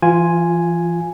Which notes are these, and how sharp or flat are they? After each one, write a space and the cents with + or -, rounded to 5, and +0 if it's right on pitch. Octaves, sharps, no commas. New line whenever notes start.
E3 +40 F4 +0 G#5 +0